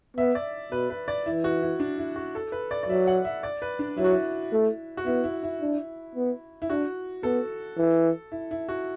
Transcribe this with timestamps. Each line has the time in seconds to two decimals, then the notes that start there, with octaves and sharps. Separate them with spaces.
0.17 B3 E5
0.35 D5
0.72 B2 B4
0.90 B4
1.08 D5
1.26 E3 E4
1.44 F#4
1.62 E4
1.80 D4
1.98 E4
2.16 F#4
2.35 A4
2.52 B4
2.71 D5
2.83 D5
2.88 F#3 E5
3.07 F#5
3.25 E5
3.43 D5
3.62 B4
3.79 D4
3.97 F#3 E4
4.04 F#4
4.11 E4
4.52 A3
4.97 F#4
5.06 B3 E4
5.24 E4
5.43 E4
5.61 D4
6.15 B3
6.62 E4
6.69 D4 F#4
7.23 B3 A4
7.77 E3
8.32 E4
8.51 E4
8.69 F#4